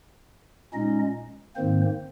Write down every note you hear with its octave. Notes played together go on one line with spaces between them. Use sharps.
A#2 G#3 C#4 D#4 D#5
G#2 D#3 A#3 C4 C5